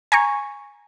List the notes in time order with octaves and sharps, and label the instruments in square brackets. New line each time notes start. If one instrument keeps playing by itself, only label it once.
[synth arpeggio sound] G#5 A#5 C#6